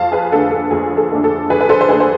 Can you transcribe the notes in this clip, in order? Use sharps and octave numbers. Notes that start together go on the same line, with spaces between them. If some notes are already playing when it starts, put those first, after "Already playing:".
Already playing: F2 F5 A5
G#4 B4
D3 A3 D4 A4
A4
F2 G#4
A4
D3 A3 D4
A4
F2 G#4 B4
B4
A4 C5
C5
D3 A3 D4 G#4 B4
C5